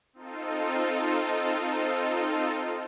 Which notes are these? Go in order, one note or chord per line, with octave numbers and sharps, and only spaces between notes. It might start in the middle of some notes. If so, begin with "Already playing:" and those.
C4 D#4 F4 A4